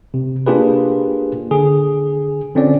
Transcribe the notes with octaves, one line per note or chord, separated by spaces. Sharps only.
C3
A#3 D4 F4 G4 G#4 B4
D3 G#4
D3 C4 C#4 F4 D5